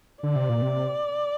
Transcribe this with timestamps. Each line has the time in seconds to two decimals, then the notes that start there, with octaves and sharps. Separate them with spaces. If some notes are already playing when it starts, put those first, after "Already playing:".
0.23 D3 D5
0.36 C3
0.49 A#2
0.62 C3